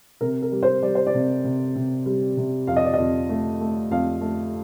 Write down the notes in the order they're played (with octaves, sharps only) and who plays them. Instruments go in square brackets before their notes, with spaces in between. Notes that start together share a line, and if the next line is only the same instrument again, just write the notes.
[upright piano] C3 A#4
A#4
G3
C5
G3 D5
C5
D5
C3
C3
C3
G3
C3
F2 F5
D#5
D5
F2 D#5
A3
A3
F2 F5
A3